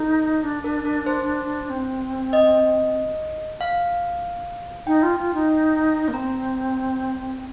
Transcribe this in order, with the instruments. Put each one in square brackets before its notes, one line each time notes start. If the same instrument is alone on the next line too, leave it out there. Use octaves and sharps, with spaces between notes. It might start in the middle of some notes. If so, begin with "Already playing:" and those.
Already playing: [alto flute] D#4 [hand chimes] A4
[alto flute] D4
[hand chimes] A#4
A#4
C5
[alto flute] C4
[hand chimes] D#5
F5
[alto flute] D#4 [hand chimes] G5
[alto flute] F4
F4
D#4
A#3
[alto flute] C4 [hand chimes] A#5